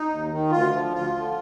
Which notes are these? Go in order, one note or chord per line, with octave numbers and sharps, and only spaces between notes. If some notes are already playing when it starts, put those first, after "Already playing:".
Already playing: D#4
D#2
D#3
D2 F4
D3 F3
D2 F4
D3 F3